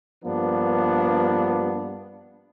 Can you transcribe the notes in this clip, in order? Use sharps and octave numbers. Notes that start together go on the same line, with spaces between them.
G2 F3 A#3 B3 D4